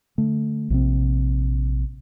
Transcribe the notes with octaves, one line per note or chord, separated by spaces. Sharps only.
D3 A3
A#1 C3 C4